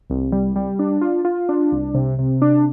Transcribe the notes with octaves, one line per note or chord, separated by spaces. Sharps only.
C2
G3
G3
D4
F4
F4
D4
C2
C3
C3
D4